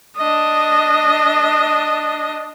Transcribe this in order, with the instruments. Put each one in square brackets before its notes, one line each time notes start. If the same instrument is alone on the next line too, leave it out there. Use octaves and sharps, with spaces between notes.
[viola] D4 D#5